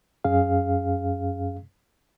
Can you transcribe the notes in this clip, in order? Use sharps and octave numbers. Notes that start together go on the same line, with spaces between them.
F#2 C#4 G#4 F5